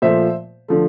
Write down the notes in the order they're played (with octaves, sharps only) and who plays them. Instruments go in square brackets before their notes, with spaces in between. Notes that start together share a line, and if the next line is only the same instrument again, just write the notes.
[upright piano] A#2 F3 A3 C5 E5
D3 F3 A3